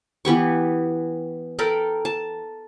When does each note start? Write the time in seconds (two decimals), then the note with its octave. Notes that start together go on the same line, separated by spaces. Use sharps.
0.25 E3 B3 G4 C#6
1.59 A4 A#4 G5 B5
2.05 A5